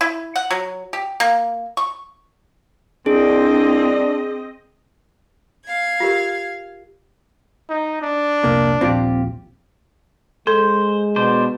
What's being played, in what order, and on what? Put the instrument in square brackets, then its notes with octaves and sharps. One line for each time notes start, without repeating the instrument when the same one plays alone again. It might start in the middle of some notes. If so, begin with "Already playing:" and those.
[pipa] E4
F#5
F#3
G4
A#3
C#6
[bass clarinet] C2 [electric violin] C4 D#5 [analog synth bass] D4 [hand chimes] G#4
[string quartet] F5 G#6
[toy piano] F4 G4 A#4
[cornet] D#4
D4
[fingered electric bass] F1 C2 [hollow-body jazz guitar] A#2 A#3
[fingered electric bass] D#1 A#1 [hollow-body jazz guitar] C4 F4 G4
[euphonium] G#3 [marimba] A4 [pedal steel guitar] C5
[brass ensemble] B2 [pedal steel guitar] D4 C5